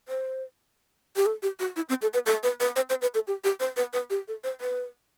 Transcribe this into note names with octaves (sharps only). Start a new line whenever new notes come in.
C5
G4
A4
G4
F#4
E4
C4
A4
B4
A4
B4
B4
C5
C5
B4
A4
G4
G4
C5
B4
B4
G4
A4
C5
B4